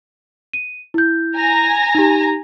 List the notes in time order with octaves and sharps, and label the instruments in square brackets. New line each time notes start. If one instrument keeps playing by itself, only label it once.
[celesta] D#7
E4 G6
[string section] G#5 A#5 A#6
[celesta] D#4 G4